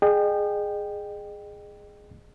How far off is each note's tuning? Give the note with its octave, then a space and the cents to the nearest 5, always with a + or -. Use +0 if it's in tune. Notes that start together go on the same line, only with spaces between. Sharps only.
G#4 +0 D#5 -40 G5 +0